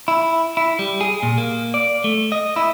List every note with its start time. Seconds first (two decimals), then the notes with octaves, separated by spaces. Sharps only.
0.08 E4
0.57 E4
0.79 G3
1.01 G#4
1.23 A#2
1.38 A#3
1.74 D5
2.04 A3
2.32 D#5
2.56 E4